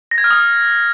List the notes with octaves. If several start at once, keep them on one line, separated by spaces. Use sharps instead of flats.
A#6
G#6
F6
D#6